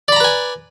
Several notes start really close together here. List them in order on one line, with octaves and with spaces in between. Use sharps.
D5 B5 A#5 B4 G#5